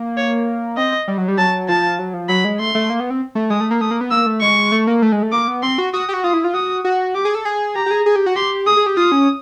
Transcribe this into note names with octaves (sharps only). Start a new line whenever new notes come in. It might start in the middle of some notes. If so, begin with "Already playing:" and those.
Already playing: A#3
C#5
C4 D#5
G3
F#3
G3
F#3 A5
F3 A5
F#3
F3
F#3 B5
G#3
A3 C6
A3
A#3
B3
C4
A3
G#3 D#6
A3
A#3
A3 D#6
A#3
B3
A#3 E6
A3
G#3 C#6
A3
A#3
A3
G#3
A3
A#3 D6
B3
C4 C6
F#4
F#4 D#6
G4
F#4
F4 D#6
E4
F4
F#4 D#6
F#4
G4 D6
G#4
A4
G#4
G4 A#5
G4
G#4
G#4
G4
F#4
G4 C6
G#4 D#6
G#4
G4
F4 D#6
C#4